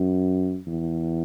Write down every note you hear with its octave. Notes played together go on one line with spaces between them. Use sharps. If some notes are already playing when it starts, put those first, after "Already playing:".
Already playing: F#2
E2